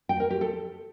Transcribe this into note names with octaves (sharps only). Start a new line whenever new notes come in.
G5
A#4
G4
A4